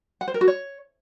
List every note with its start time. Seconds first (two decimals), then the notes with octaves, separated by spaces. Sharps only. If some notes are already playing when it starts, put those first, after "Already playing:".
0.21 F#5
0.28 C5
0.34 A#4
0.41 F#4
0.48 C#5